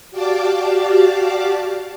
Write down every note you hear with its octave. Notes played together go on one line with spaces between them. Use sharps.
F#4 G4 D5 F5 A5 D6